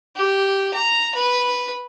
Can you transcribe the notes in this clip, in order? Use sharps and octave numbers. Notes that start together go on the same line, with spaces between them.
G4
A#5
B4